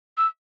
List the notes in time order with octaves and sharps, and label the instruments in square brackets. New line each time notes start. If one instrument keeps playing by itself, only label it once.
[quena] E6